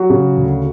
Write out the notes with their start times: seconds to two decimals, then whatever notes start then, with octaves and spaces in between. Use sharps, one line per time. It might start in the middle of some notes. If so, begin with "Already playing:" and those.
Already playing: F#3 F#4
0.10 C#3
0.37 D2